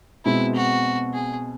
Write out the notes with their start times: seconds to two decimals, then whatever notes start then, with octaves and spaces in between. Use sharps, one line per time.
0.25 B2 G#3 C4 E4
0.55 F#4
1.13 G#4